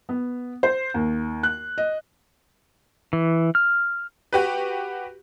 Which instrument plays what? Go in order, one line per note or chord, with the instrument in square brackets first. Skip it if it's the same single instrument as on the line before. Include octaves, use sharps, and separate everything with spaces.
[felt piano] B3
C5
D#2
F#6
D#5
[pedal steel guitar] E3
F6
[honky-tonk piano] F#4 G4 B4